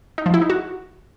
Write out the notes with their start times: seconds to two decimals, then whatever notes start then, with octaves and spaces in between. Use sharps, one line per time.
0.18 D#4
0.26 F3
0.34 E4
0.42 D#4
0.50 F#4